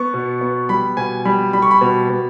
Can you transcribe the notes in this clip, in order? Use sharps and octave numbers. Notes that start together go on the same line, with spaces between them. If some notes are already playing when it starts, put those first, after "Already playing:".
Already playing: B3 C#6
B2
B3
G3 B5
B2 G#5
G3 B5
G3 B5
C#6
B5
B2
B2